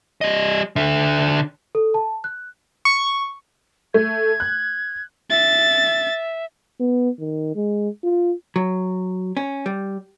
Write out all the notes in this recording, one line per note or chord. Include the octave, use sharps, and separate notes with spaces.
G3 D#5
D3 E5
A4
A5
F#6
C#6
A3 G#6
F#6
E5 A6
B3
D#3
G#3
F4
F#3
C#4
G3